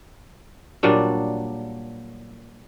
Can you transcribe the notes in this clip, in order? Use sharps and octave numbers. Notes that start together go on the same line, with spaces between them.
A#2 F#3 G3 D4